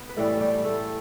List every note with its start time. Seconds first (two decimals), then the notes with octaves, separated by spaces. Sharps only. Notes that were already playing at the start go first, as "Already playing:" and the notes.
Already playing: B3
0.09 B4
0.16 A2 E3 G3 A3 A4
0.41 G3 G4
0.64 A3 A4